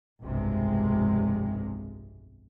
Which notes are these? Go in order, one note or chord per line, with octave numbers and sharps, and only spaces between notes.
F1 B1 G2 C3 G#3